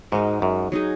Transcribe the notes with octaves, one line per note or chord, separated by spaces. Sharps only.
G#2 G#3 D#4 F#4 A#4
F#2
F#3 D#4 G#4